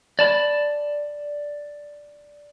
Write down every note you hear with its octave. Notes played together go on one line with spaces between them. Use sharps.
D5 A5 B5